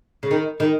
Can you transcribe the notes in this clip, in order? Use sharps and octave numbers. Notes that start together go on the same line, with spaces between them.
C#3
D#3
D#3